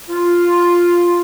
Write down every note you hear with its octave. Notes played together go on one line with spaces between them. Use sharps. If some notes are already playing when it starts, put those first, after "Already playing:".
F4